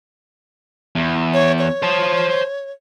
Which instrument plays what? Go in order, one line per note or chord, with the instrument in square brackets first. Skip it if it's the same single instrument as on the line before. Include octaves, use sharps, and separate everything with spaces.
[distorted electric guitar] E2
[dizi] C#5
C#5
[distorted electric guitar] C5 A5